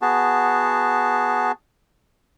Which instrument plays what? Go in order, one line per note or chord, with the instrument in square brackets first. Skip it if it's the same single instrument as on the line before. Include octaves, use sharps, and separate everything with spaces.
[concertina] B3 F#4 G#4 A5